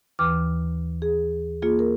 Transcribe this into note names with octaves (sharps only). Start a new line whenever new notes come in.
D#2 E3 B4 D6 F6
G#4
A#3 F4 G#4
A#4